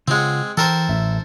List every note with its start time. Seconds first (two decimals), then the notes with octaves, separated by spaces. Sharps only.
0.08 C#3 G#3 C4 F4 F#5
0.57 E3 A4 A#4 C5 G5
0.89 A1 E5